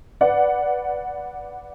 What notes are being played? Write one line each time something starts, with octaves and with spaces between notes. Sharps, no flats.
B4 D5 F#5